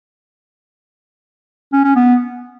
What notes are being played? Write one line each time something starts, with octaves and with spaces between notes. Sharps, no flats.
C#4
C#4
B3